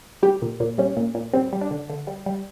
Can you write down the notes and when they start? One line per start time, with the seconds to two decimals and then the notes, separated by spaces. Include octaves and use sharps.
0.23 G3 G4
0.42 A#2
0.60 A#2
0.78 G3 C#4
0.97 A#2
1.15 A#2
1.33 G3 C4
1.53 G3
1.61 D4
1.71 D3
1.90 D3
2.07 G3
2.26 G3